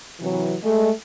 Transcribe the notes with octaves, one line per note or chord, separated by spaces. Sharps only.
C3 E3 F#3
G#3 A3